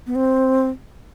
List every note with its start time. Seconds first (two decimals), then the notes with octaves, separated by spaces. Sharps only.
0.07 B3
0.15 C4